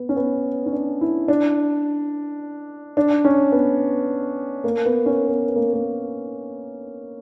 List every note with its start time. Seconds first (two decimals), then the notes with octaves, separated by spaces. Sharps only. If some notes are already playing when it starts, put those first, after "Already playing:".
Already playing: B3
0.09 C#4
0.16 B3
0.66 C#4
0.72 D4
1.01 E4
1.28 D4
2.97 D4
3.25 C#4
3.52 B3
4.64 A#3
4.85 B3
5.06 C#4
5.27 B3
5.48 B3
5.56 A#3
5.73 A#3